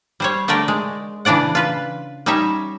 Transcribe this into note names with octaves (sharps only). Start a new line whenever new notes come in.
G3 C5 C#5
D3 A3 G4 A#4 D5 G5
G#3
C#3 E3 D4 D5 F#5
F4 B4
G3 C#4 D#4 C#5 E5